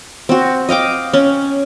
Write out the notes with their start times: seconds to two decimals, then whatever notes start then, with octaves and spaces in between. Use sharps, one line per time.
0.29 C4 F#4
0.69 D#5 F5 G5 D6
1.13 C#4